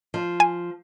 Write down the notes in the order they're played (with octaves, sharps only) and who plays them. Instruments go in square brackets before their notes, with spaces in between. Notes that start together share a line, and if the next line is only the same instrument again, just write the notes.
[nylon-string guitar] F3
[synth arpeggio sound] G#5